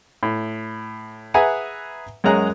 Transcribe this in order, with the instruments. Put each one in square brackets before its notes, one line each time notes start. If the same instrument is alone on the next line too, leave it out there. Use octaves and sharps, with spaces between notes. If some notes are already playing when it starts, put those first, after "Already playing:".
[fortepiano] A2
G#4 B4 E5 F#5 G#5 A#5
F#2 G#3 C#4 G#4 A#5 F#6